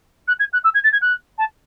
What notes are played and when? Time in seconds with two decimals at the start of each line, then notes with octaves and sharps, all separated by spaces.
0.28 F#6
0.39 G#6
0.53 F#6
0.64 E6
0.74 G#6
0.84 A6
0.92 G#6
1.02 F#6
1.38 A5